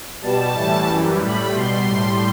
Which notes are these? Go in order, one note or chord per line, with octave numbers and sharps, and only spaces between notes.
B2 G3 A5
A2 E3 G3
F#2 E3 G3
A2 G3 B5
B2 G3 C6
A2 G3